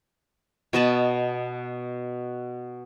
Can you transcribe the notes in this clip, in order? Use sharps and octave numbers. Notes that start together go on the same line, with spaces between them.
B2 D#5 A5 B5